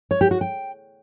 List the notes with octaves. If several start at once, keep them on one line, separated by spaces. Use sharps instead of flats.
C#5
G4
F#4
G5